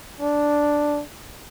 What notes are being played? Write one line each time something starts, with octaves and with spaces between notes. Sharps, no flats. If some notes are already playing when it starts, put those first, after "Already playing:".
D4